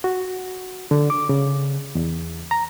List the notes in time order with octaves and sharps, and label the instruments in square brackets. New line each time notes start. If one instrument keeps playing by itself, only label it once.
[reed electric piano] F#4
D3
D6
C#3
E2
A#5